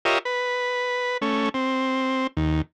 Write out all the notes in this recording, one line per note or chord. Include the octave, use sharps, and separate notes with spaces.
F4 G4 A#4 C#5 D#5 E5
B4
A3 C#4
C4
D#2